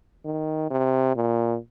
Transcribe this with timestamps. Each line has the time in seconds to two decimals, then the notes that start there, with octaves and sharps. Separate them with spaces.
0.25 D#3
0.70 C3
1.16 A#2